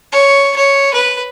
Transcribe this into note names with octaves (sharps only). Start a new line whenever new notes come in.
C#5
C#5
B4